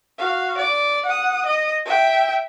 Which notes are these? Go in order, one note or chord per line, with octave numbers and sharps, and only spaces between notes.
F#4 F5
D5
F#5 D#6
D#5
E5 G5